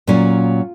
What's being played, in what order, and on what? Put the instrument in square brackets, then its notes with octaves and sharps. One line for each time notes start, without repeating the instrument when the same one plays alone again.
[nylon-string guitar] A#2 F#3 C#4 F4